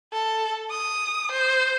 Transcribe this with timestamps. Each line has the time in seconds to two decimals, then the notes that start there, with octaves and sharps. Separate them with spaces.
0.13 A4
0.70 D#6
1.31 C5